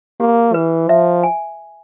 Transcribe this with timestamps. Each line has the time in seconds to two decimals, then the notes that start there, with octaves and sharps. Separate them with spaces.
0.20 A#3 G4
0.54 E3 B4
0.89 F3 E5
1.23 G#5